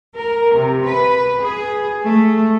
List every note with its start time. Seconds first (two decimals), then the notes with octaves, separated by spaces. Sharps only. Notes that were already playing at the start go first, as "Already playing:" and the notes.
0.16 A#4
0.55 C3
0.86 B4
1.42 G#4
2.05 A3